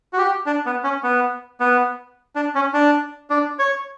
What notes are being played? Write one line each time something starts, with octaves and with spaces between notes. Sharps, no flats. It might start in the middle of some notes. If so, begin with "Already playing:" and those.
F#4
G4
D4
B3
C#4
B3
B3
D4
C#4
D4
D4
C#5